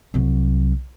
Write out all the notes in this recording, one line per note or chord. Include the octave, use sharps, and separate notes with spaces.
C2 F#3